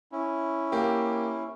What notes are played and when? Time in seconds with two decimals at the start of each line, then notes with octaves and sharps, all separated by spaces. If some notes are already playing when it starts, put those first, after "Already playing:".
0.12 C#4 E4
0.72 A#3 G4